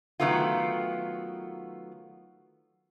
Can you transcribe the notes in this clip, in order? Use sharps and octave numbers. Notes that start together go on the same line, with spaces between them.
D#3 F#3 A3 B3 F4